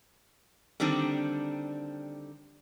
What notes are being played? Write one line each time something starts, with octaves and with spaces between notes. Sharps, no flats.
D3 D#3 G3 C4 D4